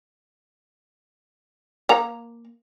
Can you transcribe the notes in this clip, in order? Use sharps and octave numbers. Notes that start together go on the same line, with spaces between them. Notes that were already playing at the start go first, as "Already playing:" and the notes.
A#3 A#5